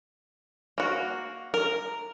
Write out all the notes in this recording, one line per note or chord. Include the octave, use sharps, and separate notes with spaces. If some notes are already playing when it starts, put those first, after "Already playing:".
A#3 F#4
A#4